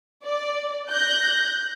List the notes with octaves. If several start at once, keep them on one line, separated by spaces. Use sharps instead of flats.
D5
F#6 G6 A#6